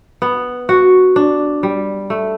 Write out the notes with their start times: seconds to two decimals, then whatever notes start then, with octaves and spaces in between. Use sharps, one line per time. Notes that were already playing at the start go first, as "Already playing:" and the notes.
0.22 B3
0.69 F#4
1.16 D4
1.63 G3
2.10 A3